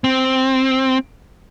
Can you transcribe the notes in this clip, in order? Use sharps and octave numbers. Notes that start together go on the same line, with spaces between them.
C4